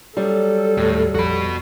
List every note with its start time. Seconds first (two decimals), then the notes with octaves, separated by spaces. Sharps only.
0.17 F#3 G3 A4
0.77 D#2 A2
1.15 A#1 F2 F#4 B5